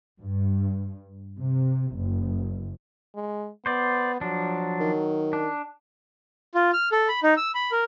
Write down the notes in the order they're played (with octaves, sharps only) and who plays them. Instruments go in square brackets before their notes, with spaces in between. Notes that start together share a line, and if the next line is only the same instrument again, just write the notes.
[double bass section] G2
C3
F#1
[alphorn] G#3
[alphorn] B3 [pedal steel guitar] C5 D5
[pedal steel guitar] F3 D4 [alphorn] F#3
[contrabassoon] D#3
[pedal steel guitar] D4
[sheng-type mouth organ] F4
F6
A4
B5
D#4
E6
B5
A#4